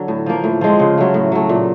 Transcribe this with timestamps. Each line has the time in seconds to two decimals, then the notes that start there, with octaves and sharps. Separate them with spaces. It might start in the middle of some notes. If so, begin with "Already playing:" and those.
Already playing: D3 F#3 D4
0.08 A2
0.26 F3 A#3
0.44 A2
0.61 F3 G#3 C4
0.79 C#3
0.97 F#3 A3
1.14 A2
1.32 F#3 A3
1.49 A#2